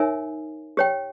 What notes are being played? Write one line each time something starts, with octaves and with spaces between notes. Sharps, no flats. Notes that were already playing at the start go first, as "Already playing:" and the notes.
Already playing: D#4 A#4 C#5 E5 G#5
G4 C#5 G5